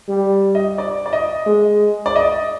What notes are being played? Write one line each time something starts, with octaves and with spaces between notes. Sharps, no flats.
G3
D#5
D5
D5
D#5
G#3
D5
D#5